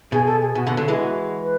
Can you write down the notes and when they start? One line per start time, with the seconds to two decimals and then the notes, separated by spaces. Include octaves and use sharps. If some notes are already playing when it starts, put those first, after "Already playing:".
0.12 B2 G#4
0.27 A4
0.41 G#4
0.55 B2 F#4
0.67 B2 D3
0.77 D3 F#3 A4
0.88 E3 G#3 G#4
0.99 F#4
1.43 B4